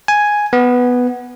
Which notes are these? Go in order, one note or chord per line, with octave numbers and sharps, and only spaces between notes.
G#5
B3